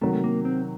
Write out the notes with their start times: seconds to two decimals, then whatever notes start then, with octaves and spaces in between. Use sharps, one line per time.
0.01 C3 D#3 F#3 A3
0.13 A3
0.24 A#3
0.45 C4